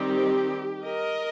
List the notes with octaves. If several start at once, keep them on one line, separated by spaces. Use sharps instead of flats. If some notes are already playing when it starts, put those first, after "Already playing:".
Already playing: D#3 G3 C4 D#4 G4
A#4 D#5